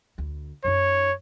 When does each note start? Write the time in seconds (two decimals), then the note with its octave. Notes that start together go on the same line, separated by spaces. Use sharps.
0.18 D2
0.65 F#2 D#4 C#5